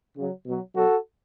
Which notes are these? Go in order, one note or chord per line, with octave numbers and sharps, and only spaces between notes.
C#3 F#3
B2 F#3
B2 F#3 F#4 A4